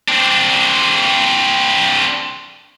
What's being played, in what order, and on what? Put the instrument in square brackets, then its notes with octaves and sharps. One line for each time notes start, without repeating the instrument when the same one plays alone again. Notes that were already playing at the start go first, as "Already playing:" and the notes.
[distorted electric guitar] C4 D4